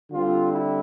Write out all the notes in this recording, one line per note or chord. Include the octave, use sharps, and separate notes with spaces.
D3 G3 C4 F4
E4